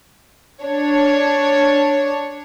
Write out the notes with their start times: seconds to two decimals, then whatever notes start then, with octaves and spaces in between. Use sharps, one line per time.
0.64 D4 C#5